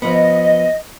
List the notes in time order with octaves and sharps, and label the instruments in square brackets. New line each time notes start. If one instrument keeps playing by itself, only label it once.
[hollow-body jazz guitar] F3 B3 [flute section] D#5